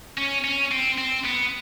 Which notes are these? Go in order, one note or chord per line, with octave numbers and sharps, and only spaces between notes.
C#4
C#4
C4
C4
B3